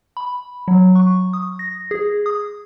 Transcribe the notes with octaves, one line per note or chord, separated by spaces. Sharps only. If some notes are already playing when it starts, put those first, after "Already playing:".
B5
F#3
C#6
D#6
A#6
G#4
D#6